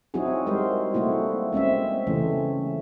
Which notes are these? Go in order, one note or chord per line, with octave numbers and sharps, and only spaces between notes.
F#3 C4 D#4 E4 F#4 G#4
G3 G#3 A#4 C5
A3 A#3 C4 E4 F#4
G#3 C4 C#4 E5
C#3 E3 A3 C#4